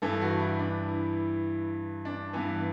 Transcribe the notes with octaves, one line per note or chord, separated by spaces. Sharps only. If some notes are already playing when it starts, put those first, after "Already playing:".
G2 E3 A4
F#4
E4
D4
E4
D4
G2 E3 B3